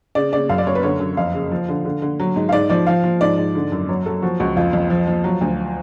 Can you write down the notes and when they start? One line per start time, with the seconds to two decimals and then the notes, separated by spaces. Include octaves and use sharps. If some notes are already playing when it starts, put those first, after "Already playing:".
0.15 C#3 D5
0.32 C#3 D5
0.49 F#2 F5
0.58 D5
0.67 F#2 C#5
0.75 B4
0.83 D3 C#5
1.00 F#2
1.17 F2 F5
1.34 C#3
1.51 F3
1.69 D3
1.85 D3
2.02 D3
2.20 F#3
2.36 G#2
2.49 F5
2.53 G#2 D5
2.70 F3 D5
2.87 F3 F5
3.04 F3
3.21 G#2 D5
3.38 G#2
3.55 D3
3.72 F#2
3.89 F#3 C#5
4.06 F#3 A4
4.22 F3 F#4
4.40 C#2 F#4
4.56 F2 F4
4.73 F2
4.90 F3
5.07 F3
5.24 F#3
5.41 D2